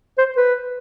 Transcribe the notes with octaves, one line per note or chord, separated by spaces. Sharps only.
C5
B4